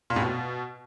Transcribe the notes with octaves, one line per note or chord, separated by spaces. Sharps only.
A#2
A2
B2